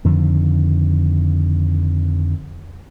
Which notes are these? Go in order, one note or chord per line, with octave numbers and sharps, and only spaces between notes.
F2 D3 D#3 F3